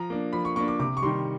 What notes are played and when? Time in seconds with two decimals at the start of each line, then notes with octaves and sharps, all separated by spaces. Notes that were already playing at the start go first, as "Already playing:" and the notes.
Already playing: F3 A#5
0.10 A#3 D4
0.33 F3 B5
0.45 C#6
0.56 A#3 D4 C#6
0.68 D6
0.80 C3 D6
0.97 C#6
1.02 G3 C6
1.05 D#3